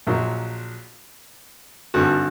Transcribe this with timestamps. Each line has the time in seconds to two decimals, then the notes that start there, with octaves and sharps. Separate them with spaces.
0.07 A#1 A#2 F#3
1.94 G#1 G2 D3 F#4